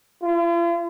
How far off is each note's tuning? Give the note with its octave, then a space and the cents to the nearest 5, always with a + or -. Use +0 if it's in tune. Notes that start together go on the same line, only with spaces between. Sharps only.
F4 -45